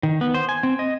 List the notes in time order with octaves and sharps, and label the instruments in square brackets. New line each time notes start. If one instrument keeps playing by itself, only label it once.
[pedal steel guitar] D#3
B3
C5
G#5
C4
D#5